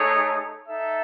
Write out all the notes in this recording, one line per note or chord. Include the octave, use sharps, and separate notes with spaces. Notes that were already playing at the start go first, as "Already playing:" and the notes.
Already playing: A3 D#4 G#4 C#5
D#4 A4 E5